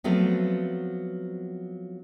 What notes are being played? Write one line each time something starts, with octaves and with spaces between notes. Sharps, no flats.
F3 F#3 A3 B3 C4